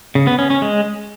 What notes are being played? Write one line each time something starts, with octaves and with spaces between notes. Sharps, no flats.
C#3
B3
C#4
C#4
G#3